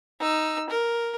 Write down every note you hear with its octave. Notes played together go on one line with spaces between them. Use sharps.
D#4 E6
A#4